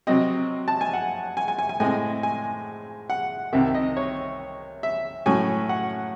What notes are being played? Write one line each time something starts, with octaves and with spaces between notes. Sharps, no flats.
C3 F#3 C4 D#5
A5
G#5
F#5
G#5
G#5
G#5
G#5
A2 G#3 C4 G#5
G#5
F#5
C2 C3 D#3 E5
D#5
C#5
E5
A2 F#3 C#4 G#5
F#5